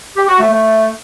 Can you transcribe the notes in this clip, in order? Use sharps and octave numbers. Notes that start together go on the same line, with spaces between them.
G4
F#4
A3
A3